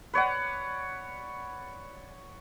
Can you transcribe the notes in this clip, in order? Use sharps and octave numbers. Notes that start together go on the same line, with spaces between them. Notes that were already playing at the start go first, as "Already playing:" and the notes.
B4 C#5 D5 F#5